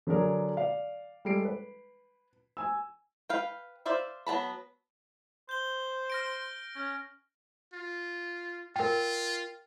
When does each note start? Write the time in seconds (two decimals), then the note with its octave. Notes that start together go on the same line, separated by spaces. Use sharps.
0.07 D3 F#3 D4 G#4 A#4
0.56 D5 F5
1.25 G3 G#3 A4 C7 D7
1.45 B4
2.57 G#5 E6
3.29 B4 F5 G5
3.86 C5 D5 E5 F5
4.27 F#3 B3 A5 B5
5.49 C5 G6 G7
6.10 F6 A#6 D7
6.76 C#4
7.73 F4
8.76 F4 A#4 G5